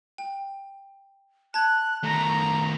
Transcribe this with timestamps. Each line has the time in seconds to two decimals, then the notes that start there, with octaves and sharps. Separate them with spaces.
0.18 G5
1.54 A5 F#6 G#6
2.04 D#3 A3 A#5